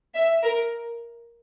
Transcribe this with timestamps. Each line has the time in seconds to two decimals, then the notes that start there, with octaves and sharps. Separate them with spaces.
0.15 E5
0.44 A#4